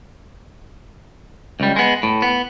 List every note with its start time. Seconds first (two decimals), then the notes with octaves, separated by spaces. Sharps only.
1.60 C#2 G3
1.76 G#3 B3
2.03 A2
2.22 B3